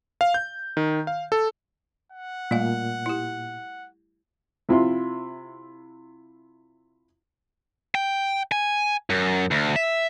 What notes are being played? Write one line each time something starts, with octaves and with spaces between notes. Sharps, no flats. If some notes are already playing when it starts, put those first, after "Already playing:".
F5
G6
D#3
F5
A4
F#5
A#2 G3 A3 F5
E4 G4
C3 E4 F4 C6
G5
G#5
F#2
D2
E5